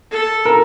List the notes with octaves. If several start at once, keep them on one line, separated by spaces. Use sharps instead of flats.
A4
A#4